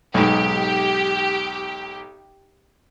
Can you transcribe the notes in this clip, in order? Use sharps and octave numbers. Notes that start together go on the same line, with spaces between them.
B1 G#2 G4